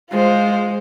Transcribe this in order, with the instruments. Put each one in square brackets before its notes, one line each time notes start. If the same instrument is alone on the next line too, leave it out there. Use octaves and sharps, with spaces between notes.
[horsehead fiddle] G#3 [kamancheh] F4 C5